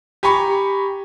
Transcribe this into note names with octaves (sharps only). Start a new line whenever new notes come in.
G4 G#5 A#5 B5 C#6